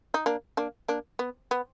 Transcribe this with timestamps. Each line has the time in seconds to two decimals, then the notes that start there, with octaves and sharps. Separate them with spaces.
0.14 D#4
0.26 A#3 D4
0.57 A#3 D4
0.88 A#3 D4
1.19 B3
1.51 B3